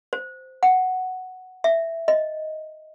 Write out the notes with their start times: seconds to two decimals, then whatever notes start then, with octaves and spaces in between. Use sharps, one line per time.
0.13 C5
0.63 F#5
1.64 E5
2.08 D#5